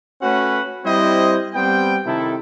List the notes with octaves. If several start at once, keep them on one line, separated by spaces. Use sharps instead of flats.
A3 C#4 F#4 B4 F#5
G3 C4 E4 C5 D#5
G3 B3 C4 G5
C3 D#3 E4 A4